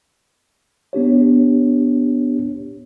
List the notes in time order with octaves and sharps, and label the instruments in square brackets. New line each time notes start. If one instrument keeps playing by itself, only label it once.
[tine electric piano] B3 D4 G4 C#5